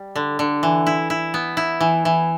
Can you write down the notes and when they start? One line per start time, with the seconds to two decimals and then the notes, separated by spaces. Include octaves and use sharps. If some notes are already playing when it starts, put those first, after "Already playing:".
Already playing: G3
0.16 D3
0.39 D3
0.63 E3
0.87 E4
1.10 E4
1.34 B3
1.57 E4
1.81 E3
2.05 E3